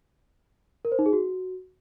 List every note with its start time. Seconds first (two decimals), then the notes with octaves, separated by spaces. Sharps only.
0.85 A#4
0.92 C5
0.99 D#4
1.06 G#4
1.13 F#4